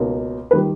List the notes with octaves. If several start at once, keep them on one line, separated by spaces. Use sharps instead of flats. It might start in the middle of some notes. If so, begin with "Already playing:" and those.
Already playing: C#2 B2 A#3 D#4
D#3 G3 B4